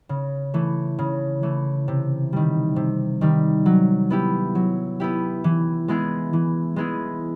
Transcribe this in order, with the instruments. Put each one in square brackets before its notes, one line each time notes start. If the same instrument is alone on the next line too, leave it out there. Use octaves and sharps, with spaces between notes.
[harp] C#3
E3 A3
C#3
E3 A3
C3
D#3 G3
C3
D#3 G3
F#3
B3 E4 G4
F#3
B3 E4 G4
E3
G#3 B3 E4 G#4
E3
G#3 B3 E4 G#4